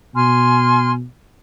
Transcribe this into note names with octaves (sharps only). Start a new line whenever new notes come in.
B2 G#5 C6 F6